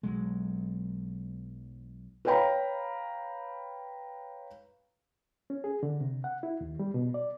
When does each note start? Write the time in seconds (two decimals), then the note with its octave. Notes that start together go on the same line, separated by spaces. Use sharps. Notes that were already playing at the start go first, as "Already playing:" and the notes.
0.03 B1 F#3 G#3
2.25 B4 C#5 F5 G5 A#5 B5
5.50 C#4
5.64 G#4
5.83 D3
6.00 C3
6.24 F#5
6.43 E4
6.61 D#2
6.79 G3
6.94 B2
7.14 D5